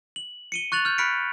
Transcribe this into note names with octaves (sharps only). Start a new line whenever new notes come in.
F#7
C#7 D#7 G7
C#6 F#6 A6 F7 F#7
F6 G6
B5 F6 F#6 B6 C#7 D7